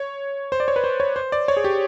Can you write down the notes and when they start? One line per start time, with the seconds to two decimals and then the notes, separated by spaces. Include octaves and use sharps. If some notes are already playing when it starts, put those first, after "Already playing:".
Already playing: C#5
0.52 C5
0.60 D5
0.68 C#5
0.76 B4
0.84 C5
1.00 C#5
1.16 C5
1.32 D5
1.48 C#5
1.57 G#4
1.64 G4